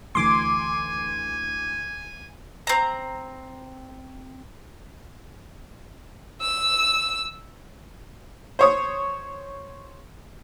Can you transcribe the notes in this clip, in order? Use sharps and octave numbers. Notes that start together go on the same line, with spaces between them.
D2 E3 G#5 C6 D6
C4 A#5
E6
C5 C#5 D#6